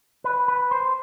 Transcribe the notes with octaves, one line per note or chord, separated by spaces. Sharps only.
B4
B4
C5